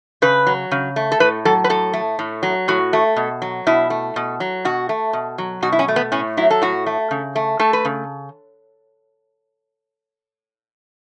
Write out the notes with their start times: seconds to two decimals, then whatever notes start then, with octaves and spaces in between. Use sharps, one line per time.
0.22 C#3 B4
0.47 F#3
0.71 C#3
0.96 A3
1.12 A4
1.20 A2 B4
1.45 F#3 A4
1.64 B4
1.69 A2 A4
1.93 A3
2.19 A2
2.43 F#3
2.68 A2 F#4
2.93 A3
3.16 B2
3.42 F#3
3.67 B2 E4
3.90 A3
4.16 B2
4.40 F#3
4.65 B2 F#4
4.89 A3
5.13 B2
5.38 F#3
5.63 B2 F#4
5.72 E4
5.79 C#4
5.88 A3
5.96 B3
6.12 A2 C#4
6.37 F#3 E4
6.50 A4
6.62 A2 F#4
6.86 A3
7.11 C#3
7.36 A3
7.59 A3 A4
7.73 B4
7.85 C#3